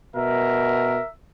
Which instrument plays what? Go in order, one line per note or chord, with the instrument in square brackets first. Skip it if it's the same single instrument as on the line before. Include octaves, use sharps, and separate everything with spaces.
[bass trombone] B2 [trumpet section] A#4 [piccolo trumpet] E5